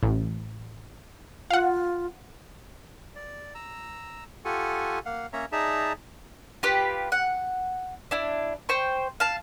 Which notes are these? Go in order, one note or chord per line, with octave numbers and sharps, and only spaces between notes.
A1
F4 F5 F#5
D5
A#5 E6
F4 G4 A4 F#5 G#5 C#6
A#3 F5 F#5
A#3 C#4 C#5 E5 A#5
D#4 G#4 D5 E5 A5 A#5
F4 G4 B4
F#5
D4 E4
C5 G5 C#6
F5 A5